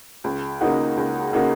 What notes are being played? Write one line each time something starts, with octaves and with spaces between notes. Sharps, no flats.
C#2
C#3 A#3 D#4 F#4
C#2
C#3 A#3 D#4 F#4